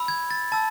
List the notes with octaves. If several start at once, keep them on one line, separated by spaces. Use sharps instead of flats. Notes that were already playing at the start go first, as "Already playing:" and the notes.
Already playing: B5 E6
G#6
A6
A5 E6 A6